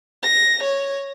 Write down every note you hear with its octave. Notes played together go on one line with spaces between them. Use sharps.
A#6
C#5